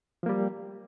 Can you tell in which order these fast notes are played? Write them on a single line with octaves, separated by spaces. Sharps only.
F3 A#3 G3